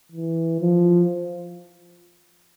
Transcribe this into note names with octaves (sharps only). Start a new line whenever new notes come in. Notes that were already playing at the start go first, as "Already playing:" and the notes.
E3
F3